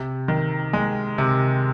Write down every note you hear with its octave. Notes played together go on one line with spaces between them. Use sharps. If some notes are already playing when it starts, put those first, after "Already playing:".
Already playing: C3
D#3
G#3
C3